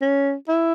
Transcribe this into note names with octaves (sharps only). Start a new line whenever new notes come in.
C#4
E4